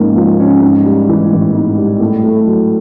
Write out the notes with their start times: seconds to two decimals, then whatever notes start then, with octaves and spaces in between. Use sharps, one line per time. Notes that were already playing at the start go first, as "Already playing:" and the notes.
Already playing: G#2 F3 A#3 C#4
0.16 F3
0.40 C#4
0.62 G#2
0.85 G3
1.09 E3
1.32 A1
1.54 G#2
1.78 G3
2.00 A2
2.23 A3
2.47 F#3